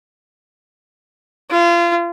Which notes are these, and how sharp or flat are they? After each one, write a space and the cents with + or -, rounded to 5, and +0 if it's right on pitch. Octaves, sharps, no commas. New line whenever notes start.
F4 -30